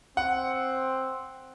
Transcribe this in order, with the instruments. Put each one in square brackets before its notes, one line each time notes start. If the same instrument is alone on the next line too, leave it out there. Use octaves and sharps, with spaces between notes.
[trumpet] C4 [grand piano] F#5